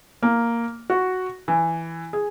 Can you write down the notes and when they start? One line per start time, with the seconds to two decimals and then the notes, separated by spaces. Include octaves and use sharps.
0.23 A#3
0.90 F#4
1.48 E3
2.13 G#4